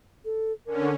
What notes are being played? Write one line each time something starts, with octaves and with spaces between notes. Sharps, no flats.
A4
D3 C#4 A#4